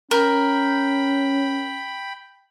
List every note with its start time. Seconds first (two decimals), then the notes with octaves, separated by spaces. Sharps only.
0.11 C#4 A#4 G5 B5